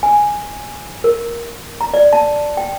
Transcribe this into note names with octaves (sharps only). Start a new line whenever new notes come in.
G#5
A#4
A#5
D5
A5
G5